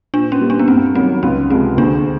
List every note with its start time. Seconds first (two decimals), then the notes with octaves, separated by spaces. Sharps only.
0.14 A#2 D4
0.32 C#4
0.41 G3 A#3
0.50 D4
0.59 B3
0.68 G2 C4
0.95 D#3 F#3 C4
1.23 C#2 C#4
1.50 C3 F3 G#3 C4
1.77 D2 D4